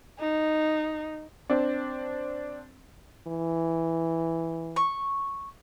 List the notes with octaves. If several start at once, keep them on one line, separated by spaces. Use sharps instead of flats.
D#4
C4 D4
E3
C#6